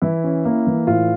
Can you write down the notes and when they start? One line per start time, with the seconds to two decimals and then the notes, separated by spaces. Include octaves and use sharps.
0.02 E3 E4
0.24 C#4
0.45 A#3
0.67 E3
0.87 A2 F4